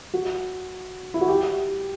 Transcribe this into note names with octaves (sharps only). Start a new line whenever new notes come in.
F#4
E4
F#4
G4